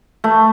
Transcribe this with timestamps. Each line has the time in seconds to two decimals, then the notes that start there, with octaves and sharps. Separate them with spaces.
0.24 A3